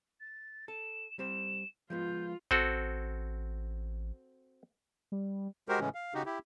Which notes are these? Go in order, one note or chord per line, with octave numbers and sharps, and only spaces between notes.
A6
A4 E7
G3 C4 C5 E7
F3 G#3 B3 F4 G6
A1 C4 F#4 A4
G3
G#3 F#4 G4 A#4 C5
A2 C#3 E3 G#3 C#4
F5
C#3 D#4 F#4 G4
E4 G4